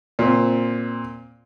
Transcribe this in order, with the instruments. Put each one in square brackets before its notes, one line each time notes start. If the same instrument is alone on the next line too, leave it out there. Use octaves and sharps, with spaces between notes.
[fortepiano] A#2 C4